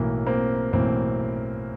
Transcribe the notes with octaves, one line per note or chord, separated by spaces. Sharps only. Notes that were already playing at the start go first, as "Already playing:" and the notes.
Already playing: B1 A2 E3 A#3
A#3 C4
B1 A2 E3 A#3 C4